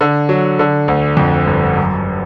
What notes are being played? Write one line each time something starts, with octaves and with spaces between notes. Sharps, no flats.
D3
F#3
D3
D2
F2
G1
F#2